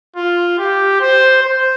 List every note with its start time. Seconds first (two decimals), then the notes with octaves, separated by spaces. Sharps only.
0.16 F4
0.58 G4
1.01 C5
1.42 C5